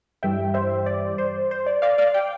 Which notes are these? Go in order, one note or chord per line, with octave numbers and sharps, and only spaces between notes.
G2 E3 G3 E5 G5
C5 E5
D5
C5
C5
D5
D5 F5
D5 F5
G5